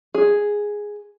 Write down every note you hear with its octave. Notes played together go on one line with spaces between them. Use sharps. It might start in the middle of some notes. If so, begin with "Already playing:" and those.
G#4